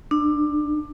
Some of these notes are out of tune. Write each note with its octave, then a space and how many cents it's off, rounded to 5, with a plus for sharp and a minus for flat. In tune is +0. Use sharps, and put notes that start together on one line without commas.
D4 +20